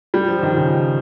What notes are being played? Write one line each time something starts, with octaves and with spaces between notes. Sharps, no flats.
G3
F3
F3
D#3
C#3